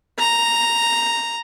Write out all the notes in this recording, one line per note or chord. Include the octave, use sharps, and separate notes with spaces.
A#5